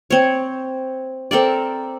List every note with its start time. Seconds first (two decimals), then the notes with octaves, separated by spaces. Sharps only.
0.10 C4 C#5
1.31 C4 A4 A#4 D5